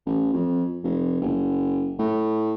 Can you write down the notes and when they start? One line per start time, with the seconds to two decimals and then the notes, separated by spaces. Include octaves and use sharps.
0.06 A1
0.33 F2
0.83 F1
1.21 F#1
1.99 A2